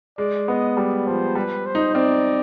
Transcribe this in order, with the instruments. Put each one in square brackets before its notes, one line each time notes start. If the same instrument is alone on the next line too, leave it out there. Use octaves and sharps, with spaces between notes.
[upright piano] G#3 [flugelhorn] D5
[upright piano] B3 [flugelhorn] D#5
[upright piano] G3 [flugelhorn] D5
[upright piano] F3 [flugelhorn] C5
[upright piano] G3 [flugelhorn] B4
[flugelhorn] C5
[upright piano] D#4
[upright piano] C4 [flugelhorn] D5